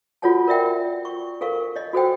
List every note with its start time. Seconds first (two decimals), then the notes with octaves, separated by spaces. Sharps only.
0.22 F4 F#4 A4 C#5 F#5 A5
0.47 A#4 D5 E5 G5
1.05 C#6
1.41 A4 A#4 F5 C#6
1.76 C#5 D#5
1.93 F#4 A4 C5 G5